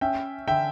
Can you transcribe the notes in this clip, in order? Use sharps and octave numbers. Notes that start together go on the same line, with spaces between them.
C#4 E5 G5
D3 E5 G5